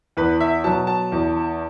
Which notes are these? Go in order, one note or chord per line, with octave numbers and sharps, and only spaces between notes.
E2 B4
E5
B2 F#3 A5
A5
E2